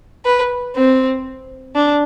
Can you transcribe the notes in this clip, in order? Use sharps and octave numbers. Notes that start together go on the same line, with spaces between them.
B4
C4
D4